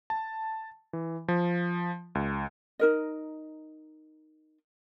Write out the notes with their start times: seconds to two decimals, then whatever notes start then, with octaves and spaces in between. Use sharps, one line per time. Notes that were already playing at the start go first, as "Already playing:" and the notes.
0.10 A5
0.93 E3
1.28 F3
2.15 C#2
2.79 D#4 A#4 D#5